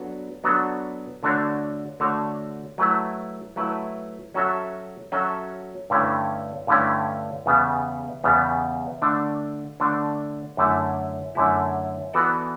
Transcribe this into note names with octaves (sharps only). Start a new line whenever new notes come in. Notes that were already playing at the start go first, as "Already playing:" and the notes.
Already playing: F#3 B3 D4 F#4 A4
F#3 B3 D4 F#4 A4
D3 A3 D4 F#4 C#5
D3 A3 D4 F#4 C#5
F#3 A3 E4 B4
F#3 A3 E4 B4
F#3 C#4 F#4 A4 E5
F#3 C#4 F#4 A4 E5
G2 D3 A3 C#4 E4
G2 D3 A3 C#4 E4
E2 C#3 G3 B3
E2 C#3 G3 B3
D3 A3 D4
D3 A3 D4
F#2 D3 A3 E4
F#2 D3 A3 E4
E3 B3 F#4 A4 D5